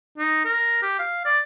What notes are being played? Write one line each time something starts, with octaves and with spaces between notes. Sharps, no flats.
D#4
A#4
G4
F5
D5